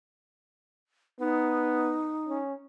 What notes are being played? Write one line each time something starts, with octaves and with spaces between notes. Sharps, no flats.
B3 D#4
C#4